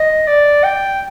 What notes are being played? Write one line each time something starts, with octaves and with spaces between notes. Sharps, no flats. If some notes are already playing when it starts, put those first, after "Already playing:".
Already playing: D#5
D5
G5